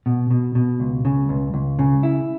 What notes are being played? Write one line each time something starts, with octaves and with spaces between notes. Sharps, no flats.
B2
B2
B2
C#2
C#3
C#2
C#2
C#3
E4